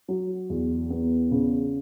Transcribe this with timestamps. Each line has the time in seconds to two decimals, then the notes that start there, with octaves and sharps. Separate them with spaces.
0.08 F#3
0.50 E2
0.90 B3
1.31 C#3